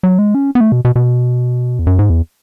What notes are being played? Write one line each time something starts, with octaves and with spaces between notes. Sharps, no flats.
F#3
G#3
C#4
B3
A3
B2
B2
B2
E2
F#2
G#2
E2